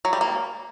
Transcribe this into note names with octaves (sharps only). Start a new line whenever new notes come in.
F#3
G3
A#3